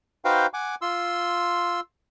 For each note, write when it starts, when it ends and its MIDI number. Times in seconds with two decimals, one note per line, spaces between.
0.25 0.47 63
0.25 0.47 66
0.25 0.47 71
0.25 0.47 72
0.25 0.47 77
0.25 0.47 79
0.54 0.75 78
0.54 0.75 80
0.54 0.75 86
0.82 1.80 65
0.82 1.80 84
0.82 1.80 88